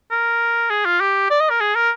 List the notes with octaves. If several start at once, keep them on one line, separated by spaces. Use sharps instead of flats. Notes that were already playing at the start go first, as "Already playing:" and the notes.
A#4
G#4
F4
G4
D5
D#5
A#4
G#4
A#4